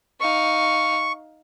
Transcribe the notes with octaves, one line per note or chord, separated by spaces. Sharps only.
D#4 F5 C#6